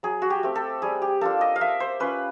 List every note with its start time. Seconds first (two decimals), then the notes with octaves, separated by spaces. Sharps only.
0.03 F#3 G#4
0.22 F#4
0.30 G4
0.43 A3 C4
0.56 A4
0.82 G3 G#4
1.02 G4
1.21 A#3 D4 F4 A4
1.41 D#5
1.56 F5
1.61 A#3 E5
1.80 C5
2.00 C#4 F4 B4